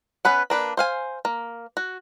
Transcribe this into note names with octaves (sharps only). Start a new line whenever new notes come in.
B3 C#4 B4 F#5
A#3 D4 B4
C5 F5 G#5
A#3
F#4